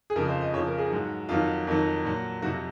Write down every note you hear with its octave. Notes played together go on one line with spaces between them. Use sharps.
G#4
F2 C#3 F3 A#4
C5
D#5
F2 C#3 F3 C#5
A#4
G#4
G#2 F#3
F2 D#3 F#3 F4
F2 D#3 F#3
A#2 F#3
F2 C3 F#3 F#4